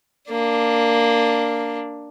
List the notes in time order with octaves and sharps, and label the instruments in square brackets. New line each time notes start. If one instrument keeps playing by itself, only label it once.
[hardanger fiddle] A#3 D4